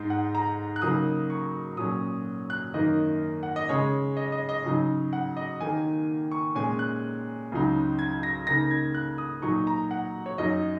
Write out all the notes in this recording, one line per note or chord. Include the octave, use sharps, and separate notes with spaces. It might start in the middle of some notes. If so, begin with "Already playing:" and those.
Already playing: G#2 G#3 D#4
F#5
A#5
F#6
C#3 F#3 A#3 D#4 D#6
C#6
A#2 F#3 C#4 D#6
F#6
F#2 D#3 A#3 D#4 D#5
F#5
D#5
C#3 G#3 C#4 C#5
D#5
D#5
D#5
C#3 F#3 D#4
F#5
D#5
D#2 D#3 A#3 D#4 G#5
C#6
A#2 G#3 C#4 G#5
F#6
C#2 C#3 F#3 D#4
G#6
A#6
C#3 A#3 D#4 A#6
G#6
F#6
D#6
A#2 F#3 D#4 C#6
A#5
F#5
C#5
F#2 F#3 D#4 D#5